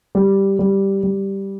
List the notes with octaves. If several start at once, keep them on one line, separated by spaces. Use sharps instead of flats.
G3
G3
G3